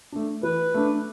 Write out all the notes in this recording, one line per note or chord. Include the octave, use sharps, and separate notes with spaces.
A3 D4
E3 B4
A3 D4